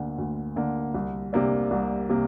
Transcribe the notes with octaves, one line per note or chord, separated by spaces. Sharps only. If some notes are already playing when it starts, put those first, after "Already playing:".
Already playing: D2 D3 A#3
D2
D3 A#3
C2
C3 A#3 D4
C2
C3 A#3